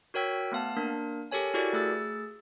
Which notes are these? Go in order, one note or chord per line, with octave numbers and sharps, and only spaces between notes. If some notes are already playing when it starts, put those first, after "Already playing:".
F#4 A#4 C#5 G5 E6 B6
A3 B3 F5 A5
A#3 D4 A#4
G4 A4 A#4 C#5 G#5
E4 F#4 G4 A4 A#4 D5
A3 G#4 E6 A6